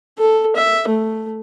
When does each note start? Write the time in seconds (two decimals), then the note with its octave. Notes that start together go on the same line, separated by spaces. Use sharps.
0.18 A4
0.56 E5
0.88 A3